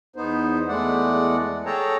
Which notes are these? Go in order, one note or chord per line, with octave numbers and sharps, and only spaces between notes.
E2 B3 D#4 C5
E2 G#3 A3 D5 F#5
G#4 A4 C#5 G5 A5 A#5